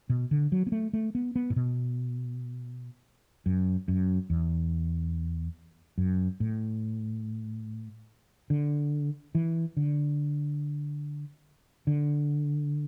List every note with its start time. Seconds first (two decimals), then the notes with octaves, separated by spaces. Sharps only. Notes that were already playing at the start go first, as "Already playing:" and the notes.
0.10 B2
0.31 D3
0.52 F#3
0.67 B3
0.72 A3
0.93 A3
1.15 B3
1.36 B3
1.50 A2
1.56 B2
3.46 F#2
3.88 F#2
4.30 E2
5.98 F#2
6.40 A2
8.50 D3
9.35 E3
9.77 D3
11.87 D3